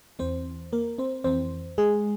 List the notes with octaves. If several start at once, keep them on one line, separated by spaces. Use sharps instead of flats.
E2 E3 C4 C5
A#3 A#4
C4 C5
F2 E3 C4 C5
G#3 G#4